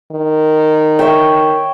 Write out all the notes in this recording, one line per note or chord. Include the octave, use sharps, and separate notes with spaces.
D#3
C#5 E5 G5